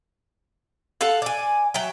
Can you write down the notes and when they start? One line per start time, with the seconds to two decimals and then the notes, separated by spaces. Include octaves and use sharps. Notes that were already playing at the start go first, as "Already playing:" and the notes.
1.01 A4 F5 F#5
1.22 D5 G#5
1.74 F#3 E5 G5